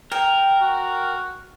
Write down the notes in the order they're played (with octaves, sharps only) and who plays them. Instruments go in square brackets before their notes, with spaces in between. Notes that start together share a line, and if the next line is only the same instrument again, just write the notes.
[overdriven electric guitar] A#4 [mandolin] G5
[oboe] F#4